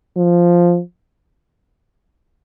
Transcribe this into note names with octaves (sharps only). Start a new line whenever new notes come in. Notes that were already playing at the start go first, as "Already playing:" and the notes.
F3